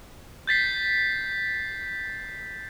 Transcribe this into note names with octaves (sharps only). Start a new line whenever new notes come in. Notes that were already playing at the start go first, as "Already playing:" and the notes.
G6 A6 B6 C7